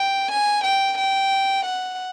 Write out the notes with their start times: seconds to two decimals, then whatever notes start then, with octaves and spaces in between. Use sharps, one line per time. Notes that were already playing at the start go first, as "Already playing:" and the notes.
Already playing: G5
0.31 G#5
0.64 G5
0.98 G5
1.65 F#5